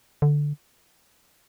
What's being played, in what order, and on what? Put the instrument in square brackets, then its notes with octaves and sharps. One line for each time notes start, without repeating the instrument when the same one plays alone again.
[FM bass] D3